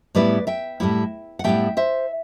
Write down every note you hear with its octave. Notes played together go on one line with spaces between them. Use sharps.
A2 G3 B3 E4 B4 D5
E5 G5
A2 G3 B3 E4
F#5
A2 G3 B3 E4 E5 G5
C5 E5